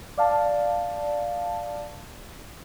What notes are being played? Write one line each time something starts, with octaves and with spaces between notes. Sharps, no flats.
D5 F5 A5